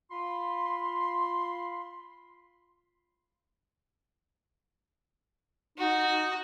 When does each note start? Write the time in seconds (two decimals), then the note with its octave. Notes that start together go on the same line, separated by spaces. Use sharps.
0.11 F4 B5 C6
5.78 D#4 F#4